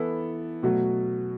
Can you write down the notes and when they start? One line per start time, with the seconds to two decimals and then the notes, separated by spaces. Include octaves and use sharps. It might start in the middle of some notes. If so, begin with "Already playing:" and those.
Already playing: E3 B3 E4 A4
0.63 B2 F#3 A3 F#4